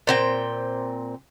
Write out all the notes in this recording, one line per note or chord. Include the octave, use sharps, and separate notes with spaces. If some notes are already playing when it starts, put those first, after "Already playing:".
A#2 C4 G5